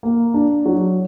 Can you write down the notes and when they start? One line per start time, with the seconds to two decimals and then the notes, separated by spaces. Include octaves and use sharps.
0.03 A#3
0.34 D4
0.65 F#3